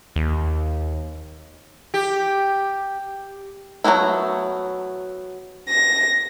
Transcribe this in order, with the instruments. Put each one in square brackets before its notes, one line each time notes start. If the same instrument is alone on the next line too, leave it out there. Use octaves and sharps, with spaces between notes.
[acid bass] D#2
[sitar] G4
[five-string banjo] F#3 G3 A3 B3 E4
[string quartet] A#6